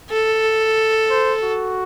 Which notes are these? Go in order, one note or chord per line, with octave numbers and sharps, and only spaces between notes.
A4
C5
F#4